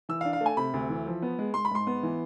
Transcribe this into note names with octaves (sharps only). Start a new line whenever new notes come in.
E3 E6
F5
D4
F5
A3
G#5
C3 B5
D2
E3
F3
B3
G#3
G#3 C6
B5
G#2 C6
B3
E3